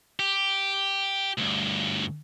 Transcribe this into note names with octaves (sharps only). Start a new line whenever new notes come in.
G4
D2 G2